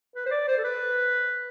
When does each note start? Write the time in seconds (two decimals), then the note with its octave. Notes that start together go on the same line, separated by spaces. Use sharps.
0.16 B4
0.26 C5
0.31 D5
0.48 C5
0.57 A4
0.64 B4